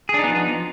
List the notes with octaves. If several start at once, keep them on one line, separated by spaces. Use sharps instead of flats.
F3 B3 D4 D#4 G#4